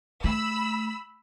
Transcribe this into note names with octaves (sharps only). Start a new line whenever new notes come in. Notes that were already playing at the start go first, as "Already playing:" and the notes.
A3 B5 E6